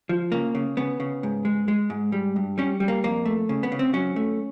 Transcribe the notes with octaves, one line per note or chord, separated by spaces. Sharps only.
F3
C#3 A#3
C#3
C#3 B3
C#3
G#2
G#3
G#3
G#2
G3
G2
G3 C#4
G3
A#3
F2 A#3
A3
C#3
B3
C#3
C4
F#3 C#4
A3